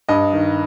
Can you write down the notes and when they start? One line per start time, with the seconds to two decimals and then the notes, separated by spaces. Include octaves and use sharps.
0.09 G2 D#5
0.33 D#3